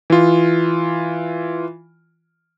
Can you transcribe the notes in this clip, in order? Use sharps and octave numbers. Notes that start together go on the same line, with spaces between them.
E3 F4